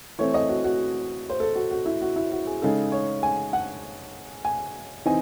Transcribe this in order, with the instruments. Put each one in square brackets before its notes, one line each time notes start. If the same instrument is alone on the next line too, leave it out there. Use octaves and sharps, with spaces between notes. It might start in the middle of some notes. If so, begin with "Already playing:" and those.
[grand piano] E3 A3 C4 C#5
D#5
F#4
F#4
C5
A4
F#4
F#4
E4
F#4
E4
F#4
G#4
C#3 G#3 D#4 A4
C#5
G#5
F#5
G#5
C3 E3 C4 D#4 G#5